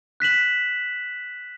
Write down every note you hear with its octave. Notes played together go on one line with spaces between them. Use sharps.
F#6 B6 E7 F#7